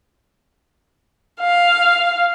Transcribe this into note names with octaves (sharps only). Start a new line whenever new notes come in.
F5